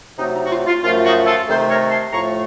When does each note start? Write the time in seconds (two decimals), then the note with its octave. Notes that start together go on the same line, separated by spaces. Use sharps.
0.19 C3 F#3 A3 D#4
0.36 D#4
0.46 F#4
0.52 F4
0.67 F4
0.83 F#2 F3 A3 F4
1.05 D#4 F#4
1.27 F4 A4
1.48 C3 D#3 A3 A4 C5
1.70 A#4 C#5
1.91 A5 C6
2.13 A2 F3 A3 A#5 C#6